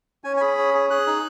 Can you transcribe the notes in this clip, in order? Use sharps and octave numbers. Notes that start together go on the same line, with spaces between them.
C#4 G#5
G#5
G#4 B5
C#4
G#4
G#4 F#6
D#4